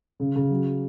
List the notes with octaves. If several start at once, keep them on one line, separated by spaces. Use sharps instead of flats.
C#3
C#3
F#3